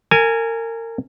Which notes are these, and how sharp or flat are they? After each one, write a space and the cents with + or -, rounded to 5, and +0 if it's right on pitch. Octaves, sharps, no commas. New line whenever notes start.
A#4 -30 G#5 +0